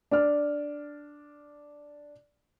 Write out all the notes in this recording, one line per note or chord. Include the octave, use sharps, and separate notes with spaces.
D4 D5 F6